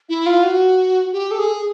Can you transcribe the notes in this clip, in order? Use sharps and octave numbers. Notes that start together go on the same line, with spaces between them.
E4
F4
F#4
G4
A4
G#4